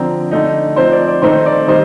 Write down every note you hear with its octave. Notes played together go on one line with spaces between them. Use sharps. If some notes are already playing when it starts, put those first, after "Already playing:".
Already playing: D3 F3 C4 G5 A#5
D3 A3 D#4
F3 C4 D#4 C5
D5
D5
D#3 A3 C4 D#4 C5
D5
D#3 G3 C5 D#5